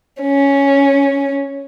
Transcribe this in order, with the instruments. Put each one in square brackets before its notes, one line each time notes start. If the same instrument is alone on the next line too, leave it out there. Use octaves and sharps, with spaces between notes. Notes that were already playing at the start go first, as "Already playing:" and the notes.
[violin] C#4